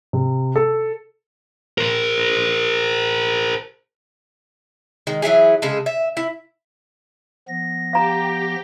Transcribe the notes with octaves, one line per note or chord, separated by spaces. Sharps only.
C3
A4
A#4 C5
D#3 G#3
E3 F#3 E4 G#4
C#3 G#3 G#4 A4
E5
E4
F3 B3 A#6
G4 F5 A#5